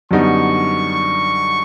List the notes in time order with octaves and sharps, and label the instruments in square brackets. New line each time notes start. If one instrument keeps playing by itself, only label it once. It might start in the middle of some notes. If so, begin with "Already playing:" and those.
[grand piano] F#2 D3 G3 B3 D#4 [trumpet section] C#6